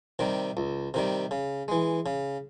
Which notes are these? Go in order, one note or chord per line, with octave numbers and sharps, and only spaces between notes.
C3 D#3 G3
C#2
C3 D#3 G3
C#3
E3 G#3
C#3